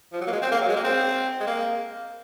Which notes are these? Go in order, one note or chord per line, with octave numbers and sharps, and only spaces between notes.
F3
F#3
A#3
G#3
C4
A#3
F#3
G#3
A#3
C4
G#3
A#3